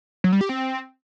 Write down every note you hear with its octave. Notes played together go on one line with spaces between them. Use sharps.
F#3
G3
G4
C4